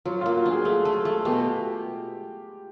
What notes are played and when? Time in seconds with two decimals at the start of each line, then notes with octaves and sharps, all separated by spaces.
0.05 F#3 F4
0.21 A#3 F4
0.36 F#4
0.46 D4
0.51 G#4
0.65 A3
0.85 A3
1.05 A3
1.25 B2 G4